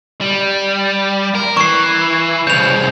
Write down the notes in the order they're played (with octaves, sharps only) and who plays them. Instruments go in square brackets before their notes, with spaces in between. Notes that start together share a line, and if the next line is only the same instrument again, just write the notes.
[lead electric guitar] G3
A#4
[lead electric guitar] E3 [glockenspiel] C#6 C7
[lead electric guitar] C2 C#3 [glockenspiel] G6 F7